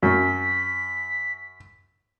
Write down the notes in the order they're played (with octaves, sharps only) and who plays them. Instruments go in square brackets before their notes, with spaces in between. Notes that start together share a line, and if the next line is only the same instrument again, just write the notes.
[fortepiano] F#2 [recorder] B6